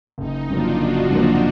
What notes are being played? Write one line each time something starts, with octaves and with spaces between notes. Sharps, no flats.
F#1 D#4
F2 D3 F#3 A#3 D4 F4
F#1 D#4 F#4
F2 D3 F#3 A#3 D4 F4